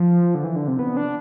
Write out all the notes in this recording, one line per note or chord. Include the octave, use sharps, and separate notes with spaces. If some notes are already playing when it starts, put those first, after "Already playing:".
Already playing: F3
D3
E3
D3
C3
B3
D4